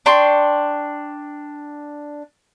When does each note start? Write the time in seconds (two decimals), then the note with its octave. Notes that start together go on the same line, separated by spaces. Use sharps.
0.06 D4 G5 C6 C#6